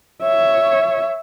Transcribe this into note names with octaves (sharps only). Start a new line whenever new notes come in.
C#5 E5